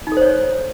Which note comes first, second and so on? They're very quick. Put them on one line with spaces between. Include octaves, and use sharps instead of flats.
D#4 A4 C5 C#5